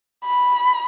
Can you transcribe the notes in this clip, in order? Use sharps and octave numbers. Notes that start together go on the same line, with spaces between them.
B5